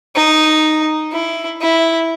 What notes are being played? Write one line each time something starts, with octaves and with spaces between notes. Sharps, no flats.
D#4
E4
E4